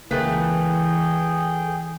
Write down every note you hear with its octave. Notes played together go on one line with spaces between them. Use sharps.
C#2 E3 A3 A#3 G#4 B4 G5 A5